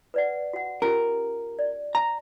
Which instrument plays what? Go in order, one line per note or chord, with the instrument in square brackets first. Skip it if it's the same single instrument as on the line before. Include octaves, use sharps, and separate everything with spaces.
[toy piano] B4 D5 F#5
F#4 F#5
[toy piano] C#4 F4 G4 [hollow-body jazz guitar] A#4
[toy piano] D5
[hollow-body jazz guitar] A#5